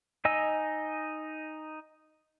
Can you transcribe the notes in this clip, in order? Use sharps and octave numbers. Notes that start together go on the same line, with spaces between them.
D#4 D#5 G#5 E6